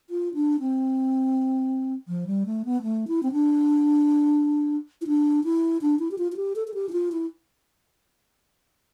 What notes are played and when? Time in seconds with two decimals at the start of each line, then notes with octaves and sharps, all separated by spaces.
0.10 F4
0.34 D4
0.60 C4
2.08 F3
2.27 G3
2.46 A3
2.65 B3
2.83 A3
3.08 E4
3.23 C4
3.32 D4
5.01 E4
5.07 D4
5.44 E4
5.82 D4
5.99 E4
6.11 G4
6.18 F4
6.32 F4
6.36 G4
6.56 A4
6.68 A4
6.74 G4
6.89 E4
6.93 F4
7.12 E4